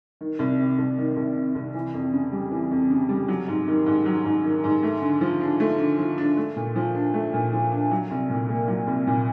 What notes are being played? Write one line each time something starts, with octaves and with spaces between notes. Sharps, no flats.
D#3
C2
C3
C2
D#3
C2
C3
C2
E3
F2
C#3
G3
E3
F2
C#3
G3
F#3
G#2
D#3
G#2
F#3
G#2
D#3
G#2
A3
D3
F3
D4
A3
D3
F3
D4
A3
A#2
F3
D4
A3
A#2
F3
D4
F#3
C2
A#2
A#3
F#3
C2
A#2